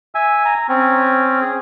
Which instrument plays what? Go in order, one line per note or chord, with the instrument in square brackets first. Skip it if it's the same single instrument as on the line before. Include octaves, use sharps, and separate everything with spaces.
[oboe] E5 [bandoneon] G#5
[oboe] A#5
[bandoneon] C4 [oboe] C#4
[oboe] G#4